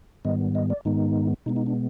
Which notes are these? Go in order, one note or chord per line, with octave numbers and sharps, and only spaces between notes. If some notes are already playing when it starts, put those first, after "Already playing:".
G#2 D#3 G3 B3 D#5
D#5
D5
G#2 D#3 G#3 B3 D#4
B2 G#3 B3 D#4
D#4
D4